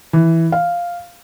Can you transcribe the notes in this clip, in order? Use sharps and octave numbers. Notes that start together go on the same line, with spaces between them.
E3
F5